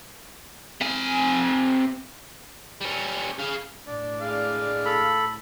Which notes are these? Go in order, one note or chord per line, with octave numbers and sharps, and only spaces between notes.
C3 G#5
G3 C#4
G#4 F5
A2 D4 D5
G#3 F5 F6
A4 B5